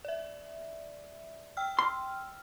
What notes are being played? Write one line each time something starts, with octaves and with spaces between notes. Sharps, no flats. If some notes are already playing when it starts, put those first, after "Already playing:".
D5 E5
G5 E6 F6
C6